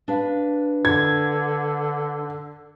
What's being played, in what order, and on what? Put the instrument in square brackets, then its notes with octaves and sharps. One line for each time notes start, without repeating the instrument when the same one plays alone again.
[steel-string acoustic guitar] D4 B4 F5
[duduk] D3 [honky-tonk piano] G#6